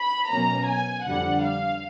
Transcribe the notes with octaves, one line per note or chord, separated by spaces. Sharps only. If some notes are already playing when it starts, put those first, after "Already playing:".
Already playing: B5
B2 F#3 A#3 C#4 A#5
G#5
F2 D3 G3 F#5
F5